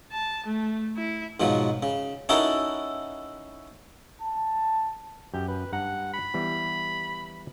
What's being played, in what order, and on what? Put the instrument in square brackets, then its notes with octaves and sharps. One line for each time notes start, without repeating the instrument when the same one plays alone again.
[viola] A5
A3
E4
[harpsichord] G#2 B2 F3 F#3
C#3
C#4 D#4 E4 F#4 A4 A#4
[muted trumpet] A5
[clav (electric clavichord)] F#2 [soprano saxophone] G4
[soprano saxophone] B4
[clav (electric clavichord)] G2 A#5 [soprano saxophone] F#5
[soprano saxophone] B5
[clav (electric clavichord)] E3 G3 B3